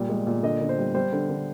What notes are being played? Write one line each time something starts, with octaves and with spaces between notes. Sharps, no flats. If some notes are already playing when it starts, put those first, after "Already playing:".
Already playing: A#2 G3
G#3
A#2
D3 D#5
D3
C5
G3
G3 C5
D3
D3